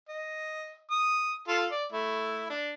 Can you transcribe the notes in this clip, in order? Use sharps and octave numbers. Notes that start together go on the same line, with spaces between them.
D#5
D#6
F4 A4
D5
A3 E4
D4